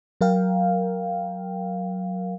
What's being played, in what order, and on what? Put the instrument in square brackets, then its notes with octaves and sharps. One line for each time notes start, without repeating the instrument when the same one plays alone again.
[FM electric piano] F#3 A#4 F5 G5